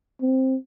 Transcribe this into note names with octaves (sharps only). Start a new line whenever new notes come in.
C4